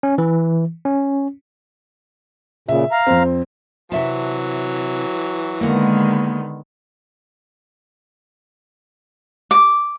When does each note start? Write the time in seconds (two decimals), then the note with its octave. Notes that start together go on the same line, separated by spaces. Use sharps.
0.03 C#4
0.18 E3
0.85 C#4
2.68 A#2 C#3 E5
2.92 F5 A#5
3.07 F2 C4
3.92 C3 E3 F#3 E5 A5
5.61 D3 D#3 G#3 A#3 B3 F#5
9.51 D6